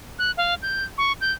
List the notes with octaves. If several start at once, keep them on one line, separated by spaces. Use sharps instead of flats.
F#6
F5
G6
C#6
G6